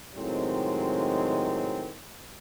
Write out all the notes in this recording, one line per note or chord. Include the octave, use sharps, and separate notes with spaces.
A2 C3 D#3 F#3 G#3 C4